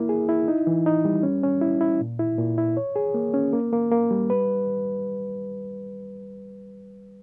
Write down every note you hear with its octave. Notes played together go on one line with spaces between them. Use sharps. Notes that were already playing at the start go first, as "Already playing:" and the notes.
Already playing: A#3 E4
G#4
E4
D#4
E3
D#4
G3
C#4
C#4
E4
E4
A#2
E4
A#2
E4
C#5
G#4
A#3
C#4
A#3
A#3
A#3
G3
B4